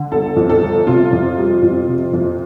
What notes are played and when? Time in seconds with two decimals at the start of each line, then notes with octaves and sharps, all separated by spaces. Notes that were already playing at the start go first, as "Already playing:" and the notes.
Already playing: D3
0.12 G1 A4
0.36 F2
0.49 A4
0.62 G1
0.87 C3 F4
1.12 F2
1.38 G3
1.62 F2
1.88 C3
2.13 F2